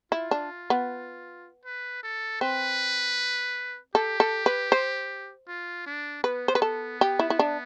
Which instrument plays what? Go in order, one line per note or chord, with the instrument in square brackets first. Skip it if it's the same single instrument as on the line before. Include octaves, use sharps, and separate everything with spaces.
[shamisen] E4 [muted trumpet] F4
[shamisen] D4
B3
[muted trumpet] B4
A4
[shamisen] C4 [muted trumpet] B4
[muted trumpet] G4 [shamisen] A4
[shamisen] A4
B4
C5
[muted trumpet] F4
D4
[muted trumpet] B3 [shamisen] B4
[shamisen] C5
B4
A4
G4
E4
E4
D4